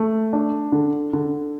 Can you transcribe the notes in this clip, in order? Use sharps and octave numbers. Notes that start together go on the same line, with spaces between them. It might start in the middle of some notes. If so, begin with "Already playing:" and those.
Already playing: A3
D4
D3
D3